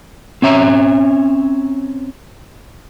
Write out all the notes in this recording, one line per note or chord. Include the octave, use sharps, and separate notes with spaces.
C4 C#4 E5 A#5